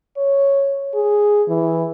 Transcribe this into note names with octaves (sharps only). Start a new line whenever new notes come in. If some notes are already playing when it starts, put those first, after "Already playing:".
C#5
G#4
E3